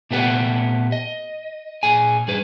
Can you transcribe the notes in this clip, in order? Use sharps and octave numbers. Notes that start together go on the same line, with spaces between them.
A#2 A3 B3 G4 B4 F#5
D#5
A#2 G#4 G#5
G2 G#4 B4